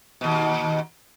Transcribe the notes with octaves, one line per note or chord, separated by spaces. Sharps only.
D#2 B2